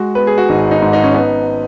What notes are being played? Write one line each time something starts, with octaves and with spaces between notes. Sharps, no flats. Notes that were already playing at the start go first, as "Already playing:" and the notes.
Already playing: G#3 F#4
B3 B4
G#4
F#4
G#1 D#4
D#4
G#2
D#4
C#4
B3 D#4